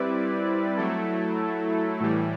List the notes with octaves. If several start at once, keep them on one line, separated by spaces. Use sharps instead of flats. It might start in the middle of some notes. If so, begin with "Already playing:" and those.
Already playing: G3 C4 E4 B4 D5
F#3 A3 E4 A4
A2 E3 G3